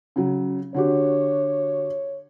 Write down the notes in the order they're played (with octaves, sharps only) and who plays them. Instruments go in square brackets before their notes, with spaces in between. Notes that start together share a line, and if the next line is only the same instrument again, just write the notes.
[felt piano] C#3 F#3
[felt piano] D3 F#4 G4 [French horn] C#5